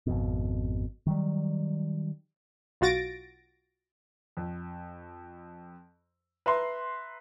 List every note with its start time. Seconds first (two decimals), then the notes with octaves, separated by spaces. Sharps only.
0.07 G#1 F2 B2
1.07 D#3 F#3 G3
2.81 B1 F4 F#4 A6 A#6 D7
4.37 F2
6.46 B4 E5 A#5 C6